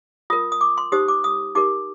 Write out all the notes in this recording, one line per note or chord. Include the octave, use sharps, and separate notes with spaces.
F4 A#4 D#6
D#6
D6
C6
D#4 G4 C5 D#6
D6
D#6
D#4 G4 A#4 D6